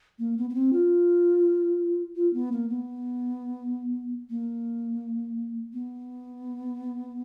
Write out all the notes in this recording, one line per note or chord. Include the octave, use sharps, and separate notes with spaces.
A#3
B3
B3
C4
F4
F4
B3
A#3
B3
A#3
B3